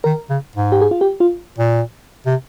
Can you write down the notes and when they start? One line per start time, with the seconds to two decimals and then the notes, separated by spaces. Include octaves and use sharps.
0.04 D#3 A#4
0.30 C#3
0.56 G#2
0.72 G4
0.81 G#4
0.91 F4
1.01 G4
1.20 F4
1.58 A#2
2.26 C3